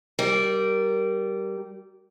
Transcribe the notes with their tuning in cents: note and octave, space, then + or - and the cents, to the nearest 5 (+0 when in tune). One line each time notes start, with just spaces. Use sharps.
G3 -15 A#4 +0